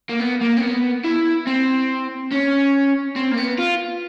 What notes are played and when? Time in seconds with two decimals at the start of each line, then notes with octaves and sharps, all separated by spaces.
0.09 A#3
0.20 B3
0.41 A#3
0.57 C4
0.61 B3
1.04 E4
1.47 C4
2.31 C#4
3.16 C4
3.32 A#3
3.37 B3
3.59 F4